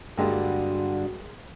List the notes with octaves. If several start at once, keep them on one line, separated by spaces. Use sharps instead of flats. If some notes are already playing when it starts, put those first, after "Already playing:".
G2 D3 G3 G#3 A#3 F#4